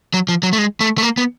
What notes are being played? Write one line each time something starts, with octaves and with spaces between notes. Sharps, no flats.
F#3
F3
F#3
A3
G#3
A3
A3
A#3
B3